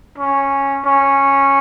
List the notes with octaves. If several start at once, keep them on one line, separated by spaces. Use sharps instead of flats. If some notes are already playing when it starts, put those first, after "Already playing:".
C#4
C#4